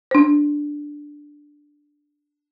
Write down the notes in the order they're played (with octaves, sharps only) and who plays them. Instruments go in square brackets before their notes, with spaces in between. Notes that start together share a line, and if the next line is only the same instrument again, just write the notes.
[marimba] D4 C5